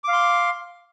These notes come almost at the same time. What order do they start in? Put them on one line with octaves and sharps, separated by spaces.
D6 F5 C6